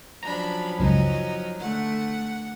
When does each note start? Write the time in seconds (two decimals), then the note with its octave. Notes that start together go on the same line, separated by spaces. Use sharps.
0.23 F3 F#3 C#4 D4 A#5 B5
0.79 C#2 F#2 D#4
1.59 D3 A3 F#5